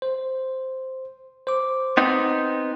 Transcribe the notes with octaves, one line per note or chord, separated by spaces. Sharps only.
C5
C5 D6
B3 C4 D#4